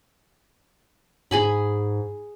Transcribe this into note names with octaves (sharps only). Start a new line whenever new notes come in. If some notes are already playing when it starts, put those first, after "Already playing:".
G#2 G#4 G#5 B5